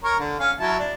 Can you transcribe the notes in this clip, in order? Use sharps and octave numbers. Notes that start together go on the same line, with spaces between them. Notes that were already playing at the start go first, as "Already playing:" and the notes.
A#4 C#5
D3
C#4 F5
F#3 E4 A5
D4